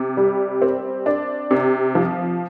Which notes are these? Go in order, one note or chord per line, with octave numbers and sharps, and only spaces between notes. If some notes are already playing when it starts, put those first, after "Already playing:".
Already playing: C3
G3
C4
D4
C3
F3